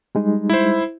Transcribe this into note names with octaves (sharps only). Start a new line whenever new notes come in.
G3 G#3 D#4
E4 C5